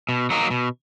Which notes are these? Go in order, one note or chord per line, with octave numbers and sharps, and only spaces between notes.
B2
F#3 A#3 D#4
B2